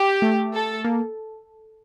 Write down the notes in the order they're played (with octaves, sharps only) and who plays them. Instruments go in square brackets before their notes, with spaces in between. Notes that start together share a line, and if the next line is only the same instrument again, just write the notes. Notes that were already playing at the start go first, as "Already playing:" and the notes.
Already playing: [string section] G4
[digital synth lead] A3
[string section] A4
[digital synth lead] A#3